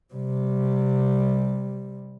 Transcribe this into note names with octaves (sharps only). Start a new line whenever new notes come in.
C3 G3